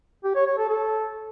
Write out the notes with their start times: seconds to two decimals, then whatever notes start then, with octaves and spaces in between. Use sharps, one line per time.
0.24 G4
0.35 C#5
0.46 C#5
0.57 A4
0.69 A4